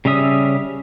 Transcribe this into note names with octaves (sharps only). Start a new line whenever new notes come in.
C#3 G3 C#4 E5 D#6